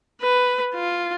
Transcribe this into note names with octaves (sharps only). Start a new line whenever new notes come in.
B4
F4